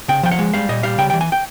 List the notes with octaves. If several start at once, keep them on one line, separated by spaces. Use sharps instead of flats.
C#3 G5
F3 G5
F#5
G#3
G3 F5
A#2 D#5
G3 F5
C#3 G5
E3 G5
G#5
G5